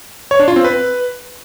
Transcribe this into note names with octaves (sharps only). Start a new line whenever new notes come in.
C#5
D4
F4
C4
B4